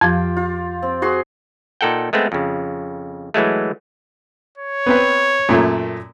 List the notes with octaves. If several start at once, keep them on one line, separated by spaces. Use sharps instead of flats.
F2 F3 F4 G4
F4
C4
F#4 G#4 C6
A#2 D#4 A4 F#5 G5
G#3 A3 B3 C4
F2 C#3
E3 F#3 G#3 A3
C#5
B3 C4 B4
F#2 A#2 A3